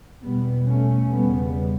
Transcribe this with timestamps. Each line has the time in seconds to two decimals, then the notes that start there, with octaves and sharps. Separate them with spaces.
0.22 E2 B2 G3 B3
0.66 A3 C#4
1.11 E2 C#3 G3 B3